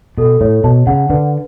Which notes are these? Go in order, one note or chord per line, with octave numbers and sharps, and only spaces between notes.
B2 A4
A2 C#5
B2 A5
C#3 F#5
D3 B4